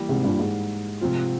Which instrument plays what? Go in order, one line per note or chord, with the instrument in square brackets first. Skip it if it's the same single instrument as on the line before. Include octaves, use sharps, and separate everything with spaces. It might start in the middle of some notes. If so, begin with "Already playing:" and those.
Already playing: [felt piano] E3 G3 A#3
[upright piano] G#2 C3
G2 A#2
G#2
[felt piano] C3 F3 C4 F4